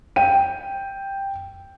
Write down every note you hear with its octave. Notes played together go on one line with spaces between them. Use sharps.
G5 D#7